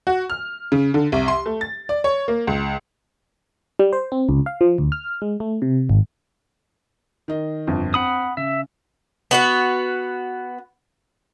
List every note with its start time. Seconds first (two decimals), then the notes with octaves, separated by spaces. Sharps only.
0.07 F#4
0.30 F6
0.72 C#3
0.94 D3
1.12 C2
1.28 C6
1.46 A3
1.61 A6
1.89 D5
2.04 C#5
2.28 A#3
2.47 C#2
3.79 G3
3.93 C5
4.12 C4
4.29 C#2
4.46 F5
4.61 F3
4.78 D2
4.92 F6
5.22 G#3
5.40 A3
5.62 C3
5.90 G#1
7.28 D#3 D#5
7.67 G1 F2
7.94 C4 F#5 B5 D#6
8.37 C#3 E5
9.31 B3 F#4 B4